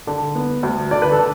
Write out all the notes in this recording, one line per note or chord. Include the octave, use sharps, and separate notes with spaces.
D3
B3
D2
D3 D5
B4
A4
D3